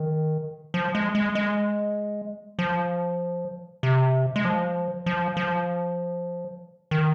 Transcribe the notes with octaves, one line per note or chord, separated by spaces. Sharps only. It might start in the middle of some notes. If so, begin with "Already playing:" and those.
Already playing: D#3
F3
G#3
G#3
G#3
F3
C3
G#3
F3
F3
F3
D#3